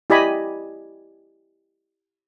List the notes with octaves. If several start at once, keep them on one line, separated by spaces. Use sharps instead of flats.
E4 G4 D5 D#5 G#5 B5